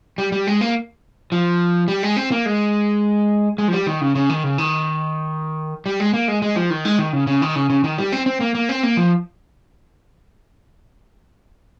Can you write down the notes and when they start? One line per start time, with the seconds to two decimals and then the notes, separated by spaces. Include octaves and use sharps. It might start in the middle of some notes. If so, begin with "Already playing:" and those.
0.18 G3
0.32 G3
0.47 G#3
0.61 A#3
1.32 F3
1.88 G3
2.03 G#3
2.16 C4
2.31 A#3
2.46 G#3
3.58 G#3
3.68 F3
3.73 G3
3.87 D#3
4.01 C#3
4.15 C#3
4.29 D#3
4.44 C#3
4.58 D#3
5.86 G3
6.00 G#3
6.14 A#3
6.28 G#3
6.42 G#3
6.56 F3
6.70 D#3
6.85 G#3
6.99 D#3
7.13 C#3
7.27 C#3
7.42 D#3
7.56 C#3
7.70 C#3
7.84 D#3
7.98 G3
8.12 C4
8.26 C4
8.41 A#3
8.55 A#3
8.69 C4
8.83 A#3
8.97 F3